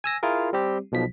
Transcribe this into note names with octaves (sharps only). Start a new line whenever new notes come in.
G#5 E6 A#6
E4 F4 G#4 A#4
G3 C4 G4
B1 B2 F3 B6